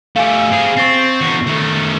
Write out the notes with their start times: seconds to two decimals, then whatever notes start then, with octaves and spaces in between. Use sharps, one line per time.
0.16 A3 G4 F5 G#5
0.51 C4 G#4
0.77 C4 C#6 A6 C7
1.21 E2 F#4
1.46 D#3 A3